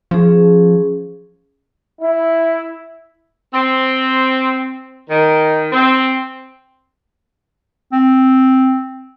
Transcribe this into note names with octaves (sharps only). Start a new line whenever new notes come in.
F3 C#4 G#4
E4
C4
D#3
C4
C4